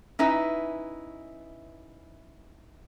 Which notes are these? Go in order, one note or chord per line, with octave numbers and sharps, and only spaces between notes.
C#4 D#4 E4 B4 E5